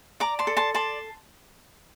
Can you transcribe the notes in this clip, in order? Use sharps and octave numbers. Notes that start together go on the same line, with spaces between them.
D5 A#5 D6
A5 C6
A4
A5 C6
D5 A5 C6